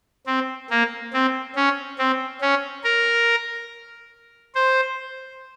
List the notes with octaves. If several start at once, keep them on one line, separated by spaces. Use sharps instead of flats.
C4
A#3
C4
C#4
C4
C#4
A#4
C5